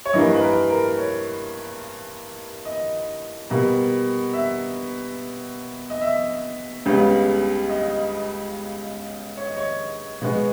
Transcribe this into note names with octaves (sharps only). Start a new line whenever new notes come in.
C#5
G2 E3 A#3 D#5
B4
A#4
A#4
C#5
D#5
B2 G3 A#3
E5
D#5
E5
C#2 C#3 G3 B3
D#5
C#5
D#5
C#5
B2 G#3 B3